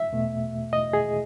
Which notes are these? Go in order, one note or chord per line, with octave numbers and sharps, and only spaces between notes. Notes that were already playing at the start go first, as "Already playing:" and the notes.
Already playing: E5
E2 B2 A3
D#5
G#4